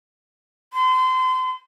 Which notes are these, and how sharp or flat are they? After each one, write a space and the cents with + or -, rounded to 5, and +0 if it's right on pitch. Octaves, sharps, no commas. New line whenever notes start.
C6 -35